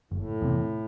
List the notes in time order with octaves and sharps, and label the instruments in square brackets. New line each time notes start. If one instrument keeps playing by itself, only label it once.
[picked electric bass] F#1 [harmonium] A2
[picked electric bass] E2 C3